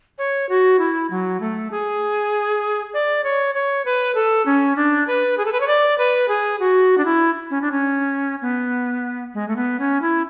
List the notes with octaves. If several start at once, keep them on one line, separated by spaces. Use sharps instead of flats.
C#5
F#4
E4
F#3
A3
G#4
D5
C#5
C#5
B4
A4
C#4
D4
B4
G#4
A4
B4
C#5
D5
B4
G#4
F#4
D4
E4
C#4
D4
C#4
B3
G#3
A3
B3
C#4
E4